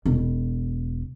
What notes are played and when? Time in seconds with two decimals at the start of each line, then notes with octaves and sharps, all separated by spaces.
0.06 E1 E4